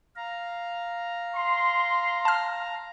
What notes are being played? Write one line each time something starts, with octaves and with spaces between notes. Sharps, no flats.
F5 A#5
C6
A5 F6